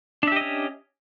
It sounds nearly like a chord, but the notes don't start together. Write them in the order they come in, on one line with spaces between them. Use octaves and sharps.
D4 E5 G4 D#5 C#4